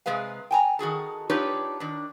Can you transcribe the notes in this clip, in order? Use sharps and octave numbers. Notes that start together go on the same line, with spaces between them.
C3 G#3 G#4 B4 F5
G5 G#5 A#5
D#3 F#4 G#4 A4
D4 D#4 F4 G4 B4 C#5
D#3 D4